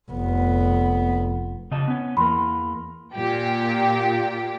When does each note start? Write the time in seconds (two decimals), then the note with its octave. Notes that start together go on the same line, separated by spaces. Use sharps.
0.11 F1 B3
1.71 C#3 D#5 A5
1.87 B3 C#4
2.17 E2 E3 A#3 B5 C6
3.16 A#2 G4